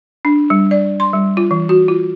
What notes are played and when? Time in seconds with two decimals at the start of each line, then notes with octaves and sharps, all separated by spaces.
0.25 D4
0.50 G3
0.71 D5
1.00 C6
1.13 G3
1.37 F4
1.51 E3
1.69 F#4
1.88 F4